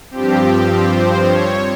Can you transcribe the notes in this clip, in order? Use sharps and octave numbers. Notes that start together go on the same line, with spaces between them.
G2 F3 C4 G4
C5
C#5